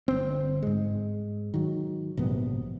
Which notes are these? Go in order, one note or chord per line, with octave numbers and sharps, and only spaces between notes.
G1 C4
G#2 G#3
D#3 F#3
A#1 G#2 C3 B3